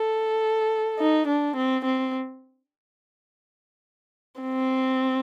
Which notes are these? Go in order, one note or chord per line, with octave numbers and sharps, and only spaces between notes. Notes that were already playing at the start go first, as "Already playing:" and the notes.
Already playing: A4
D#4
D4
C4
C4
C4